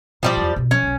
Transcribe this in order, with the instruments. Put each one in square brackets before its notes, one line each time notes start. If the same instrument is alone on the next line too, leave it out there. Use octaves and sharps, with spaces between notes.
[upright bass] A2 [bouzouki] F3 G3 D5
[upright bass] E2 E4
B2 D4
[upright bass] F3 [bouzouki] C#4
[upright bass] B1 D4